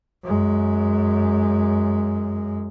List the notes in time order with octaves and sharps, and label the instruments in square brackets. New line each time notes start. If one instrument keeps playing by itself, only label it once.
[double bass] F#2 G#3